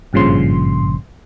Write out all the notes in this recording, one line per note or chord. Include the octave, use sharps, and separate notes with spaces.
G#1 G2 A#2 C#3 F3 C6